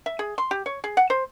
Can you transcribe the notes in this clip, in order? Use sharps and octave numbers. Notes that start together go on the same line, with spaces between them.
E5
G#4
C6
G4
C#5
G#4
F#5
C5